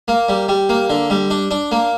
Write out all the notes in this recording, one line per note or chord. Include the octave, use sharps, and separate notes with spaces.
A#3
G3
G3
A#3
D3
G3
D4
D4
A#3